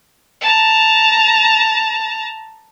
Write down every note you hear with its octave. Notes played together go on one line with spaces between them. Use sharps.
A5 A#5